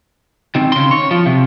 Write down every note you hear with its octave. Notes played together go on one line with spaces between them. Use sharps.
D#3 C4
C#3 C6
C#5
F3
C3